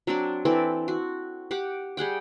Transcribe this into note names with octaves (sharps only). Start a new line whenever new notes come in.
F#3 C4 D4 D5
E3 C4 A4 D5
F#4
G4 F#5 D6
G3 G#4 F#5 G5